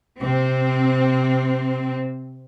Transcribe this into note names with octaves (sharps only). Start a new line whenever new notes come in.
C3 C4